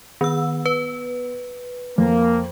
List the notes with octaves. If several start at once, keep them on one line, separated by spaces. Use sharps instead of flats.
D#3 B3 E6
B4
F2 A#3